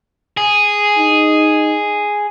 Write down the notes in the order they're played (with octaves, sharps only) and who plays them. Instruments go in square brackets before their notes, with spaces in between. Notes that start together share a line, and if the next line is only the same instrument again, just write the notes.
[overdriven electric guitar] G#4
[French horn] D#4